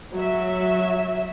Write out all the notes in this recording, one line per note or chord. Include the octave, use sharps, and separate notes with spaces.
F#3 E5